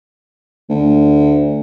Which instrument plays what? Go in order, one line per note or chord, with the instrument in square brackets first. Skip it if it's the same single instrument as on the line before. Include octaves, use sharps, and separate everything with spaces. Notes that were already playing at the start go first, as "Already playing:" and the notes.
[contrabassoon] D2